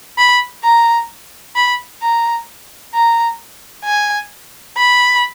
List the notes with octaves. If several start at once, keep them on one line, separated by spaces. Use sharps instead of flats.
B5
A#5
B5
A#5
A#5
G#5
B5